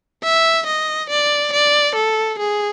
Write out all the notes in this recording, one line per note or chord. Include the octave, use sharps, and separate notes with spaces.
E5
D#5
D5
D5
A4
G#4